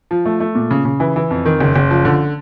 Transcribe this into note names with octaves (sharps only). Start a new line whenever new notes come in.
F3
A3
A3
A#2
C#3
C#3
E3
E3
F2
D#3
F#1
F#1
F3
D3